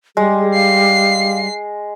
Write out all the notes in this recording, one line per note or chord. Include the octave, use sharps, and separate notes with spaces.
G3 G#3 G#4
F5 C7